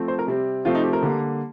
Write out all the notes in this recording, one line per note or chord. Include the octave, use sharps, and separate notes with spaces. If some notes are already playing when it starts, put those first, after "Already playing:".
Already playing: F3 A3 C4
C5
A#4
C3 G3 C4
C3 F3 A3 C4 F4
D#4
G4
A#4
D3 G3 A#3